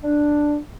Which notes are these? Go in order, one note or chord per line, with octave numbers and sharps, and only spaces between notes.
D4